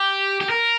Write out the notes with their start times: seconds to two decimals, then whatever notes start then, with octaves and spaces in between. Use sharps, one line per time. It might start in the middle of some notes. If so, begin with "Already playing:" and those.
Already playing: G4
0.41 G4
0.50 A#4